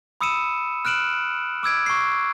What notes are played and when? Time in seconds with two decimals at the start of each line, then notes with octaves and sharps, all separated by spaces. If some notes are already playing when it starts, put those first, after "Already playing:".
0.21 B5 D#6 E6 C#7 D#7 E7
0.85 F6 F#6 D7 E7 F#7
1.63 D6 E6 G#6 D7
1.86 C#6 C7